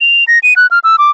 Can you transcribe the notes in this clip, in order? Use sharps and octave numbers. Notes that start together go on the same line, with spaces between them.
F7
A#6
D#7
F#6
F6
E6
D6